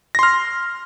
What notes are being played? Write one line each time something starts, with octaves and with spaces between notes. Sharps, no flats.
C6 F6 A#6